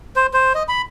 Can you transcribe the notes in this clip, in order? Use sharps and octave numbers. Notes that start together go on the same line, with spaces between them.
C5
C5
D#5
B5